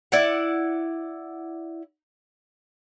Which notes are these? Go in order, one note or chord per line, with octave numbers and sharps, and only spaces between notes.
E4 D5 F#5